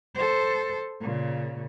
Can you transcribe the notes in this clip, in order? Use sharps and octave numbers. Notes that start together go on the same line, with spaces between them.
A4 C5
A#2 C#3